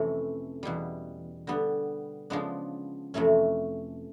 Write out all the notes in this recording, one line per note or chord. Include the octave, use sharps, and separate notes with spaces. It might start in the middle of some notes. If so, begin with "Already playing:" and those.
Already playing: F2 C3 E3 A3 C#4
E2 B2 G3
D3 G3 B3
C#3 F3 G#3 B3 D4
F2 C3 E3 A3 C#4